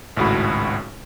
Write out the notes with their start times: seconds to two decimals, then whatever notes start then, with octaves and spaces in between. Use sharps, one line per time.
0.17 G#1 C#2 A2 F#4 B5